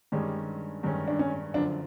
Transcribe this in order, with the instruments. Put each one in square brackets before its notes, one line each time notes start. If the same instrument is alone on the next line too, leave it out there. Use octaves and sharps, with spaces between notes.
[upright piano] G2 D#3 G#3 C#4 [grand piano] G3
[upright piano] G2 D#3 G#3 C#4
[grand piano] D4
C#4
[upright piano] F#2 D3 F3 [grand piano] D4